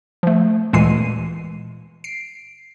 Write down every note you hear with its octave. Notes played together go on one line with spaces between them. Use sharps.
F3 A3
D2 A#2 E3 G#3 C7 D#7
C7 D7